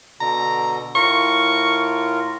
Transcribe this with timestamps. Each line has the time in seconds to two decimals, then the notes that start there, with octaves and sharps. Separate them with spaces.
0.20 B2 D3 A#5
0.95 A2 F4 A#4 C#6